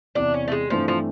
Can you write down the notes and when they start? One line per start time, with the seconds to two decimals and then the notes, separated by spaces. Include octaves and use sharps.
0.15 E2 C3 E3 D4
0.34 C#4
0.48 A3
0.52 G#3
0.70 G2 E3 F3 A3 C4
0.88 F3